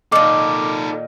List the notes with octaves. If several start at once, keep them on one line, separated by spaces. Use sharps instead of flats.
A#2 D#3 D#4 A4 D6